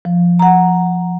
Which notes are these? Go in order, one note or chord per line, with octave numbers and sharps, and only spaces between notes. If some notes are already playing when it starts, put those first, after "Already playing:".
F3
F#5 A#5